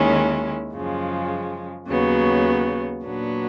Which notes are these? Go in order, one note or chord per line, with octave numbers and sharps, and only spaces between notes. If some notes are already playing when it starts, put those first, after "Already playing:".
Already playing: D#2 D#3 G#3 C#4 E4
F#2 C#3 F3 G#3
D#2 C#3 F#3 B3
A#2 F#3 B3 D4